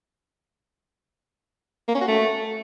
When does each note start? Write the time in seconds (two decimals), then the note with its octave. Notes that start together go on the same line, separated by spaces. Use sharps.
1.88 A#3
1.95 C#4
2.01 F#4
2.08 A3